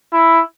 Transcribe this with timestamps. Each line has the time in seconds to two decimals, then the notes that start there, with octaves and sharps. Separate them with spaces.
0.13 E4